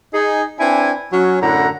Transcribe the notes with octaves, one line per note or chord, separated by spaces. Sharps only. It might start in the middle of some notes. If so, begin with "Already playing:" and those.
D#4 G#4
C4 D4 E4 B4 G#5
F#3 C#4
F#2 A2 D3 E4 F#5 A#5